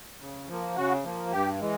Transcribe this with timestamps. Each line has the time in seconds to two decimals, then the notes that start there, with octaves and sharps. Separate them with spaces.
0.20 C#3
0.48 F3 A#3
0.76 C#3 F#4
1.04 F3 A#3
1.32 G2 G4
1.61 E3 G#3